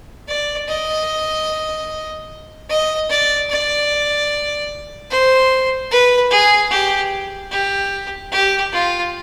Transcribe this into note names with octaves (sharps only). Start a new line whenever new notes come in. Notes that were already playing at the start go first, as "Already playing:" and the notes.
D5
D#5
D#5
D5
D5
C5
B4
G#4
G4
G4
G4
F4